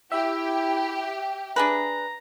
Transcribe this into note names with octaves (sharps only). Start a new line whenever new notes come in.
E4 G4 E5
D4 G#4 B4 A#5